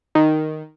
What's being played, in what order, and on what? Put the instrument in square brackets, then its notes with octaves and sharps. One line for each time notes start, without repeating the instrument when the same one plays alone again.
[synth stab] D#3